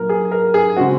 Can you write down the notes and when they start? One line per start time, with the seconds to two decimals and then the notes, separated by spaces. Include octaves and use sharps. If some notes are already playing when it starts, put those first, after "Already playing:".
Already playing: A#2 F#3 A#3 A#4
0.09 G#4
0.32 A#4
0.54 G#4
0.77 C#3 G#3 C4 F#4